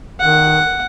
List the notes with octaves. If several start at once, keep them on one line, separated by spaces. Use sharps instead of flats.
D#3 F#5